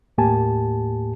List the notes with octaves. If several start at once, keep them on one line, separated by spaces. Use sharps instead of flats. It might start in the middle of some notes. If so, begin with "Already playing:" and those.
D#2 A2 A#3 G4 G#5 A5